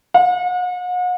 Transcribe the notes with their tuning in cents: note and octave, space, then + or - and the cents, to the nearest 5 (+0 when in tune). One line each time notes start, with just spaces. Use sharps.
F#5 -40